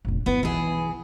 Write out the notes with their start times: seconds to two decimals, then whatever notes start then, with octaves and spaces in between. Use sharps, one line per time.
0.05 F1 A#1
0.26 G1 B3 E4
0.43 B1 E3 G#4